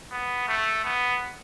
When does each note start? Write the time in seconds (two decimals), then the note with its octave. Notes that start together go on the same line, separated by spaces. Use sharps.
0.12 B3
0.48 A3
0.84 B3